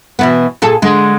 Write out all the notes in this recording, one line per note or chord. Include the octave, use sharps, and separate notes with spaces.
B2 E3 B3
A#2 G#4 A4
D3 G#3